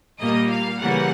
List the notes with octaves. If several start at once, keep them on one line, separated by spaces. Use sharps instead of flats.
A#2 G3 A#3 D#5
F5
C#3 E3 G3 A#3 F#5